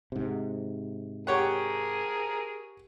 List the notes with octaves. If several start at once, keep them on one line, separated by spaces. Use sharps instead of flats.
G#2 C3
G4 G#4 A#4 C#5 F#5